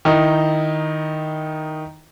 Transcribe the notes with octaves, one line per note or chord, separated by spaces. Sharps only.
D#3 D#4 E4